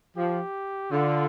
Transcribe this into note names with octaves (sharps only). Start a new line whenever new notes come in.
F3 G4
D3 F4